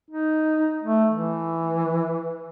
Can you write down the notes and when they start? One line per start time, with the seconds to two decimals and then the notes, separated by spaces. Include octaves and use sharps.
0.11 D#4
0.84 A3
1.12 E3